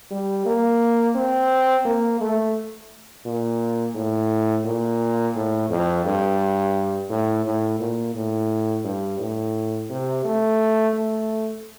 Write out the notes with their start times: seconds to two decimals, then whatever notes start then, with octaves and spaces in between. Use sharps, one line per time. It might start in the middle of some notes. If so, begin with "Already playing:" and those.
0.11 G3
0.46 A#3
1.15 C4
1.85 A#3
2.21 A3
3.25 A#2
3.95 A2
4.65 A#2
5.36 A2
5.70 F2
6.05 G2
7.09 A2
7.45 A2
7.80 A#2
8.15 A2
8.84 G2
9.20 A2
9.90 C3
10.25 A3
10.94 A3